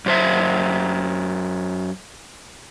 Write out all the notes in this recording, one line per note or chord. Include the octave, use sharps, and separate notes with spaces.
F#2 C5 E5